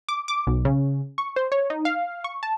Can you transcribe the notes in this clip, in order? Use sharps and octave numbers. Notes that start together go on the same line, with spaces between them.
D6
D6
B1
C#3
C#6
C5
C#5
D#4
F5
C#6
A5